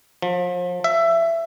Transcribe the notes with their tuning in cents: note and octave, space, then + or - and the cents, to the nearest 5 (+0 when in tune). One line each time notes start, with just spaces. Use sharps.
F3 +35
E5 +15